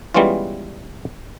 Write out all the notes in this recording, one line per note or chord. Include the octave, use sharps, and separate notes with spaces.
E3 G3 G#3 B3 C#4 F4